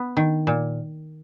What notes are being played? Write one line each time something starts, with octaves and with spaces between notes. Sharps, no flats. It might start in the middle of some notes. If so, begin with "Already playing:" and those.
Already playing: B3
D#3
A#2